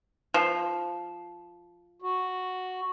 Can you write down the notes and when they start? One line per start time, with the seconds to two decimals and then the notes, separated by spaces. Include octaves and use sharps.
0.34 F3
2.02 F#4